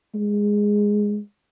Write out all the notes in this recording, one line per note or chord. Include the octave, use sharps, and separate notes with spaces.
G#3